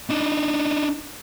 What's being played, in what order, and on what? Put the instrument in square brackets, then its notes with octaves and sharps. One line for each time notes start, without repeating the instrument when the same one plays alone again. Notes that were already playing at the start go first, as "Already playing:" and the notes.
[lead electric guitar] D4 D#4